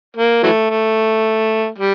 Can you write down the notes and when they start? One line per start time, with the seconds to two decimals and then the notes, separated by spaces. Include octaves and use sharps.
0.17 A#3
0.43 E3 F#3 A3
0.70 A3
1.78 G3